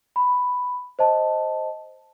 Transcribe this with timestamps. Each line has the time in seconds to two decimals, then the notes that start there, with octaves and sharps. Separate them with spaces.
0.16 B5
0.99 C5 D#5 A5